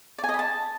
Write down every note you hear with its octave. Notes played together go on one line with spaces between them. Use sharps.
D5
G#5
D#5
B5
A5